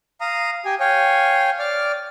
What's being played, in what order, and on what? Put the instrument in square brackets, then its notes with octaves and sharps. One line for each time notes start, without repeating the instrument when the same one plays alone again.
[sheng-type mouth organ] F5 A#5 D#6
G4 G#5
C#5 F5 G5 G#5
D5 D6 F6